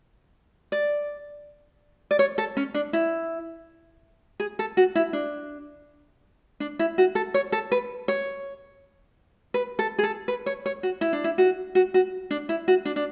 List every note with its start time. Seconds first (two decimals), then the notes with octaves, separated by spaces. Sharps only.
0.72 D5
2.11 D5
2.19 C#5
2.38 A4
2.57 C#4
2.74 D4
2.93 E4
4.40 G#4
4.59 A4
4.77 F#4
4.95 E4
5.13 D4
6.60 D4
6.79 E4
6.98 F#4
7.15 A4
7.34 C#5
7.52 A4
7.72 B4
8.08 C#5
9.54 B4
9.79 A4
9.99 G#4
10.03 A4
10.28 B4
10.46 C#5
10.66 C#5
10.83 F#4
11.01 E4
11.13 D4
11.24 E4
11.38 F#4
11.75 F#4
11.94 F#4
12.31 D4
12.49 E4
12.68 F#4
12.85 D4
12.96 D4